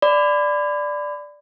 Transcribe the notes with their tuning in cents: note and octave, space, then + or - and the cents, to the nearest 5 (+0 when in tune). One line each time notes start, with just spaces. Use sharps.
D5 +0 B5 +30